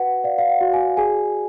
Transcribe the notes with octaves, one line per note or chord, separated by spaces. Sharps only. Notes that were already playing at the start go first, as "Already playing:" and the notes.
Already playing: F#4 B4 F#5
D5 F5
F5
F#5
F#4
G#5
G#4 G#5